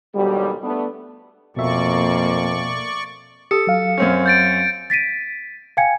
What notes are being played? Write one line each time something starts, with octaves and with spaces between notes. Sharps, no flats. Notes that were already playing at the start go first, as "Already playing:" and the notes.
D#2 G#2 B2 D3 F#3 G3
A3 B3 D4
F2 B2 A#3 D5 E5 C#6
G4 A4 D#6 C#7
F#3 F5
F#2 C4 C#4
G6 A6 D7
A6 B6 D7 D#7
F5 G5 G#5 G#6 C#7